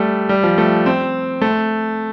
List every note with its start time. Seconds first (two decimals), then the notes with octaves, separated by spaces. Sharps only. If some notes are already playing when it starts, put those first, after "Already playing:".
Already playing: G3 A3
0.29 G3
0.43 F3
0.58 A3
0.86 C4
1.41 A3